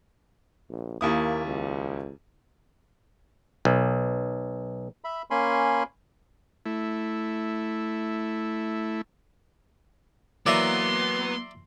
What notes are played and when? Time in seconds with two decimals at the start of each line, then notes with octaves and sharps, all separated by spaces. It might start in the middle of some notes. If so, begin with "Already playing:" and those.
0.70 A#1
1.01 D#2 A#3 E4 D#6
1.45 C#2
3.65 B1
5.04 E5 B5
5.31 A#3 C#4 G#5 B5 C6
6.66 A3 E4
10.46 E3 F#3 A#3 B3 D5 E5 A#5 C6